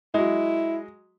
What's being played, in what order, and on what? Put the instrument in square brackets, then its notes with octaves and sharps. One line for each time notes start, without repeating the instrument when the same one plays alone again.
[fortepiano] F#3 G#3 [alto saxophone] E4